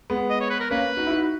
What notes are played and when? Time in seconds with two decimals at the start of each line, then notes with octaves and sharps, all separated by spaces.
0.10 G#3 B3
0.30 D#5
0.41 C#5
0.50 B4
0.60 A#4
0.71 A#3 C#4 B4
0.97 D#4 F#4
1.07 E4
1.10 D#4 F#4